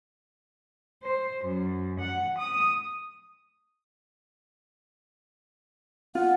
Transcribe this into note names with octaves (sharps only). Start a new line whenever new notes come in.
C5
F#2
F#5
D#6
F4 F#5